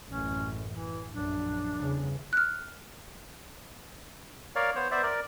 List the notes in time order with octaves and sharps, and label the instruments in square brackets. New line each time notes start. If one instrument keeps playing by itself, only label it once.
[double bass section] A1 F#2 [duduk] C#4
[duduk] E3
[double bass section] A#1 F#2 [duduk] D4
[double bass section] G1 E2 C#3
[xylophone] F6 F#6
[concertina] A#4 C#5 D5 F5
B3 C5 C#5
B3 C5 D5 E5
A#4 D5